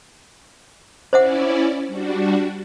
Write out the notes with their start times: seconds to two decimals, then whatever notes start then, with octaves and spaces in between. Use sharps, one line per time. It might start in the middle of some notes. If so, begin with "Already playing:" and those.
1.13 C#4 E4 C5 D5 E5 F#5
1.87 G3 D4 F#4